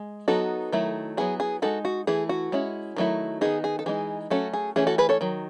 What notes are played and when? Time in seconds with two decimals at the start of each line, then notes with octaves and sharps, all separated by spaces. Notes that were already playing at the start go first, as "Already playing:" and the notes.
Already playing: G#3
0.28 F#3 B3 D#4 F#4 A4
0.72 D#3 F#3 A3 E4
1.17 F#3 B3 E4 G#4
1.40 G#4
1.62 G#3 D#4 F#4 A4
1.85 F#4
2.07 E3 A3 E4 G#4
2.29 F#4
2.52 G#3 C#4 E4
2.96 D#3 F#3 A3 E4
3.41 D#3 G#3 B3 D#4 G#4
3.64 G#4
3.79 A4
3.86 E3 G#3 D#4 G#4
4.30 F#3 A3 C#4 F#4 A4
4.54 G#4
4.76 E3 A3 C#4 E4 G#4
4.87 F#4 A4
4.98 G#4 B4
5.09 A4 C#5
5.21 D#3 F#3